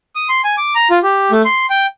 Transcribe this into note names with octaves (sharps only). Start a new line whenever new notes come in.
D#6
C6
G#5
D6
A#5
F4
G4
A3
C6
G5